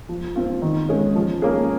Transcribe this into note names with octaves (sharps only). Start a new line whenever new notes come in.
F3
C4 F4
D#3
G#3 C#4 G#4
F3
A#3 C#4 G#4